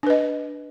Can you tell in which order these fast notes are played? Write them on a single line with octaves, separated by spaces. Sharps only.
D4 B4 D#5